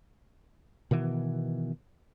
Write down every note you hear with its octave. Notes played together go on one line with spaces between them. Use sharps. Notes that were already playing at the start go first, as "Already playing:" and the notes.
B2 D#3 E3 B3